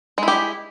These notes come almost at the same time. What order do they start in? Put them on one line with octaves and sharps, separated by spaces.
G#3 E4 G4